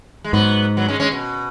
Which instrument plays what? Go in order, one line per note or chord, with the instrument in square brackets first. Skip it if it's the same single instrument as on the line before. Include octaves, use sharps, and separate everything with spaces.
[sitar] G#3
[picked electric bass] G#2 [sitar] F#3 B3
[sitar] F#3 B3
G#3 C#4
G#3 C#4
B2